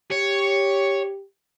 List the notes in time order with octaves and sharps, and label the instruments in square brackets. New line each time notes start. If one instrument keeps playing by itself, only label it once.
[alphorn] G4 [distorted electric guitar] C#5